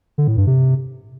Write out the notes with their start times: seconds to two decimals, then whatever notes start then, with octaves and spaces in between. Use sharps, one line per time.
0.18 D3
0.28 A2
0.37 G2
0.47 C3